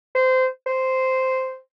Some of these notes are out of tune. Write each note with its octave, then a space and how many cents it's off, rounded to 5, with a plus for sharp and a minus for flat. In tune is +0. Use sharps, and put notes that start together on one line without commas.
C5 -20
C5 -5